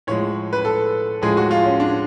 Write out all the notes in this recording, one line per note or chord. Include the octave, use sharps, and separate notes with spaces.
A2 F3 G#3 C#5
B4
A4
A2 F3 G#3 G#4
F#4
F4
C#4
D4